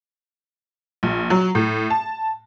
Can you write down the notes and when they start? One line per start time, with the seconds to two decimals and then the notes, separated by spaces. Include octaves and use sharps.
1.03 A#1
1.30 F#3
1.55 A2
1.90 A5